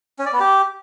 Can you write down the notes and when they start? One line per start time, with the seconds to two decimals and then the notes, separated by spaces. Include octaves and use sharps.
0.19 C#4
0.26 D5
0.33 B3
0.40 G4